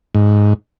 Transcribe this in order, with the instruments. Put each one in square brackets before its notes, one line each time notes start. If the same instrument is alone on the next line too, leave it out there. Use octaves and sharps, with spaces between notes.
[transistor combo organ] G#2